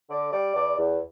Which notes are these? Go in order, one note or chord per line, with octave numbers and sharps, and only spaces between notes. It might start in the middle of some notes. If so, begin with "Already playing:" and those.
D3 D5
G3 D5
E2 D5
E2